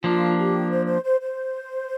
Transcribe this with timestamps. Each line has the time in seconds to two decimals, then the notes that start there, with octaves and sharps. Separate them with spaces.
0.03 F3 A#3 D4 F4
0.36 G4
0.71 C5
0.86 C5
1.03 C5
1.20 C5